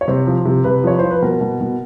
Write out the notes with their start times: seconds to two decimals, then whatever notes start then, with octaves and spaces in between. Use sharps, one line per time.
0.01 C#5
0.08 C3 C5
0.27 F3
0.45 C3
0.64 C3 B4
0.84 F3 C#5
0.99 F3 C5
1.11 B4
1.22 B2 A#4
1.41 B2
1.61 B2